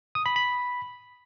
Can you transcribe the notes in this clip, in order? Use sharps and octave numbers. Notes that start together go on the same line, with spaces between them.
D#6
B5
B5